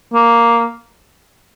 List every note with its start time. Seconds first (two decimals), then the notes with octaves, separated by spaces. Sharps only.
0.14 A#3